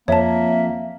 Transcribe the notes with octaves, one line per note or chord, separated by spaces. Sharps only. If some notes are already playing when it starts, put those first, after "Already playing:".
F2 A#3 C#5 E5 A5